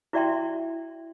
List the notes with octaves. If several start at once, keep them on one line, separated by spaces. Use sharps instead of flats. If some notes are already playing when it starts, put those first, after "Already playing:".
E4 F#4 D5 E5 G5 C6